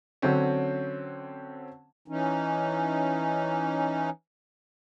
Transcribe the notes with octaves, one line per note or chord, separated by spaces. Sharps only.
D3 F#3 C4 C#4
E3 C#4 D#4